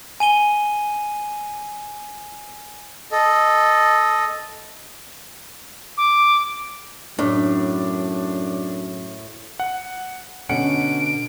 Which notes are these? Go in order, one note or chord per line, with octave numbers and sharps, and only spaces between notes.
G#5 D#7 G7
A4 D#5
D6
F#2 A2 D4
F#5
B2 D3 C#4 F#5 C#7 D7